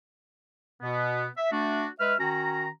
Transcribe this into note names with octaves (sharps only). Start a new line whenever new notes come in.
B2 B3
E5
A3 D4 F#4
G#3 B4 E5 F6
D#3 C#4 F#4 A#5